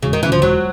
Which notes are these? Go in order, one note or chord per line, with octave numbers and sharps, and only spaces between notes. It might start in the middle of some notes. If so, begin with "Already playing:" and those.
E1 C#3
D#3
D2 C#3 E3
F3
E1 F#3